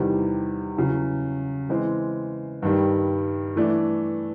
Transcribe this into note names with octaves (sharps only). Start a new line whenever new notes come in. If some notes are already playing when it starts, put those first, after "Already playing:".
Already playing: E2 C3 D#3 G3
E2 C#3 F#3
E3 G#3 C4
G2 D#3 G3
E3 A3 D4